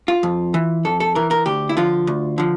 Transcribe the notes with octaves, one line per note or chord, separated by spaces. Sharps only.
F4
F2
E3
F2 A4
A4
E3 A#4
A#4
D2 G4
E4
D3 F3 F4
D2
D3 F3